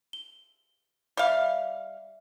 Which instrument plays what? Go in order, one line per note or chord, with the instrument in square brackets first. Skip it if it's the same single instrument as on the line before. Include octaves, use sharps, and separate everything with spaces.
[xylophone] G7
[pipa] G3 F5 [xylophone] E5 D6